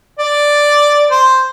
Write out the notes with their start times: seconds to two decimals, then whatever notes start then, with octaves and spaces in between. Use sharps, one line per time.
0.19 D5
1.10 C5